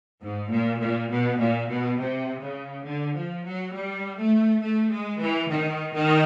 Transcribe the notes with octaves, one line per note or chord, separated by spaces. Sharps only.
G#2
A#2
A#2
B2
A#2
B2
C3
C#3
D3
F3
F#3
G3
A3
A3
G#3
E3
D#3
D#3